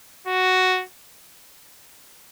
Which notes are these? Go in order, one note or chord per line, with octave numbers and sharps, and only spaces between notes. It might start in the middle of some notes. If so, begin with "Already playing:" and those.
F#4